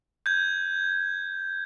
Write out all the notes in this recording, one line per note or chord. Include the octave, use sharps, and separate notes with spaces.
G6 G#6